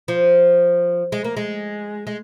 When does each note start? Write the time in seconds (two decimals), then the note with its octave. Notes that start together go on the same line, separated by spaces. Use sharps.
0.08 F3
1.12 G#3
1.24 A#3
1.37 G#3
2.07 G#3